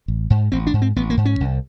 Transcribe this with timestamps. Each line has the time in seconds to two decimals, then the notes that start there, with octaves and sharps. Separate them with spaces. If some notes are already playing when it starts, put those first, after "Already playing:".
0.08 A1
0.30 G#2
0.52 A1 C4
0.67 D4
0.74 G#2
0.82 C4
0.96 A1 B3
1.10 A#3
1.17 G#2
1.25 C#4
1.40 C2